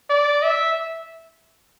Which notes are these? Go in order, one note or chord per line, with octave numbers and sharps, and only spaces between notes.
D5
E5